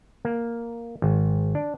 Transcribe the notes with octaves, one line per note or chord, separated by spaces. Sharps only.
A#3
G#1
D4